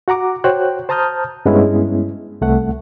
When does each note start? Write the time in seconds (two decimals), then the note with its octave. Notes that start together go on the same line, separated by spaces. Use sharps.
0.08 F#4 F#5 A#5 D6
0.44 F#4 C5 C#5 G5 F#6
0.89 C5 A5 A#5 D#6 F6 G6
1.46 G2 G#3 B3 C#4 E4
2.41 C2 A3 F#5